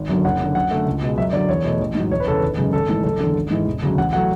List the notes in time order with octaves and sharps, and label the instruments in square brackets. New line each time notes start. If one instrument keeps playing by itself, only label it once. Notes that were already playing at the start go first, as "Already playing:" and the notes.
Already playing: [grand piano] G#1
F#2 D3 F#3
F#1 F#5
F#2 D3
F#2 F#5
D3 A3
C#2
B2 G#3
F#2 E5
D3 F#3 D5
E2 C#5
B2 A3
A1
G#2 F#3
E1 C#5
B4
E2 C#3 A4
B4
G#1
F#2 C#3 G#3
G#1 A4
G#2 E3 A3
F#1 A4
E2 D3
G#1
G#2 E3 G#3
E1
D2 C#3 F#3
A1 F#5
F#3 A3 F#5